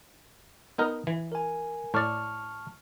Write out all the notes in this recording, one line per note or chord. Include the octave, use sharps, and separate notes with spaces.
B3 D#4 A#4
E3
A#4 G#5
A2 D5 A5 C#6 F6